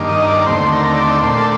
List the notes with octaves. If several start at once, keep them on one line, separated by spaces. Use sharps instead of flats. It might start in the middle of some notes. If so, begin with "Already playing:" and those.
Already playing: G2 D#3 A#3 D4
D#5
D5
D#2 D3 A3 C4 C5
A#4
D5
A#2 A3 D4 C5
A4